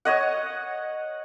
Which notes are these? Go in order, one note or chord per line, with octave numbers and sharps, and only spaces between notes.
C#5 D#5 F#5